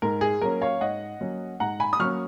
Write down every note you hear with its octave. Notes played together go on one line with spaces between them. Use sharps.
G#2 A#4
G#4
F#3 A#3 C#4 A#4
C#5 F5
G#2 D#5 F#5
F#3 A#3 C#4
G#2 F#5 A#5
G#5 B5
D#6
F#3 A#3 C#4 C#6 F6